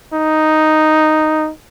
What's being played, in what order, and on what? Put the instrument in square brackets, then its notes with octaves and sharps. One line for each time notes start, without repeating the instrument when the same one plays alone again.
[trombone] D#4